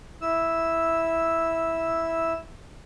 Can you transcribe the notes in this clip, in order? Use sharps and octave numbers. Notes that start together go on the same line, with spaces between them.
E4 E6